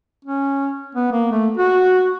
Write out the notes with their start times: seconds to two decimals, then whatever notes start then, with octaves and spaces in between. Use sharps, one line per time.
0.25 C#4
0.95 B3
1.12 A#3
1.32 A3
1.57 F#4